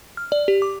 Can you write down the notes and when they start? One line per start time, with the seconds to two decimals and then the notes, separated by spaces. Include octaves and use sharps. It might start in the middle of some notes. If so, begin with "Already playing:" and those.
0.17 F6
0.32 D5
0.48 G4
0.62 D6